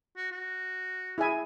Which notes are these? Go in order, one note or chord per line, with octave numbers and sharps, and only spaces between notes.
F#4
F#4
E4 G#4 E5 G#5